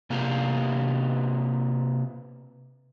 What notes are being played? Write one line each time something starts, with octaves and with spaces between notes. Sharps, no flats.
C3 A#3 F4 G4